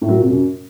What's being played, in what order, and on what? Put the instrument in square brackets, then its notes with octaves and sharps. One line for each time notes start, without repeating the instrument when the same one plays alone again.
[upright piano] A2
F#3
A#2
C3
F#2